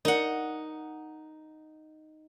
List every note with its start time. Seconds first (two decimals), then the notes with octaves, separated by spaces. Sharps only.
0.05 D#4 A#4 D5 D#5 F#5